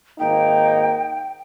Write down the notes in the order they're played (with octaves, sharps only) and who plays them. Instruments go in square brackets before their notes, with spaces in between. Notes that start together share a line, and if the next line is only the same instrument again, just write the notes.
[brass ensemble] G#1 A#3 D#4 [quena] G5